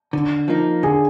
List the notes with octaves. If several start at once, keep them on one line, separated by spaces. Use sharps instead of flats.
D3
F3 A#3 D#4
D3 G#4